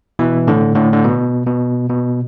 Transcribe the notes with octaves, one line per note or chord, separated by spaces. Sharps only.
B2 E3
A2 D3
A2 D3
D3
B2
B2
B2